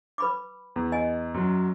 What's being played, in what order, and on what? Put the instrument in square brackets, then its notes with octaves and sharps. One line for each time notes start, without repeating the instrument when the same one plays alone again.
[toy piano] B4 B5 D6
[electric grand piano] E2
[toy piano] D#5 G#5
[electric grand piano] F#2 F#3